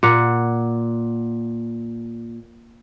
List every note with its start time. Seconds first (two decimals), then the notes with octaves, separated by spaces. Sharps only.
0.03 A#2 F#5